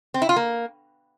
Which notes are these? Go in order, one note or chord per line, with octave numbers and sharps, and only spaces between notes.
C4
E4
F4
A#3